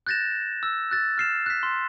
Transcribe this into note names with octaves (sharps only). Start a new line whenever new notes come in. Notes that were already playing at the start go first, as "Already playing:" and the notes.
F#6 G6 A6 A#6 E7
E6
F#6 A6
F6 C7 E7
F#6 B6
C6